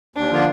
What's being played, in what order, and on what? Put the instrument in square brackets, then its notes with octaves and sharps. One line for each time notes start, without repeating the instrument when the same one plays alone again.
[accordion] D#2 [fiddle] D4
[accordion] D3 F3 A#3 F4